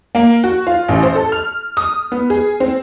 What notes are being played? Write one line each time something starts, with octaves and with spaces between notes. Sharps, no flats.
A#3
F#4
F4
A1
C5
A4
F6
D#6
B3
G#4
C4